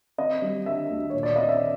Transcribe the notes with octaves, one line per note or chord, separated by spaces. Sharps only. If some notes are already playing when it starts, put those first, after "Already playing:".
C4 D#5
G3
D3 E5
D2
A#2 C#5
D5
C4 D#5
E5